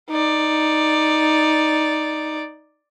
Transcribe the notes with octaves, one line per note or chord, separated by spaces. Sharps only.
D#4 D5